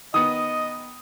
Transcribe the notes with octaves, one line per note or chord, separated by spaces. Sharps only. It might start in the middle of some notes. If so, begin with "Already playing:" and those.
D#3 B3 D#5 D#6